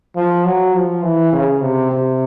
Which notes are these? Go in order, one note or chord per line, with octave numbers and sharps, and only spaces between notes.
F3
F#3
F3
E3
C#3
C3
C3